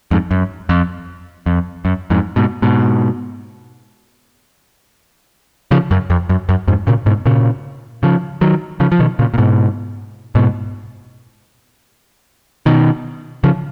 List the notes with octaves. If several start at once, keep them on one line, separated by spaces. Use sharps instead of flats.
F2 G#2
F#2
F2
F2
F#2
F2 G#2
G#2 B2
G#2 B2
C#3 F3
F#2
F2
F#2
F#2
F2 G#2
A#2 C#3
G#2 B2
A#2 C#3
C#3 F3
D#3 F#3
C#3 F3
F3
B2 D#3
A#2 C#3
A#2
G#2 B2
G#2 B2
B2 D#3
C#3 F3